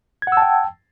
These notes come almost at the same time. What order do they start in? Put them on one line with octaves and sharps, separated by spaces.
G#6 F#5 E6 A5 G5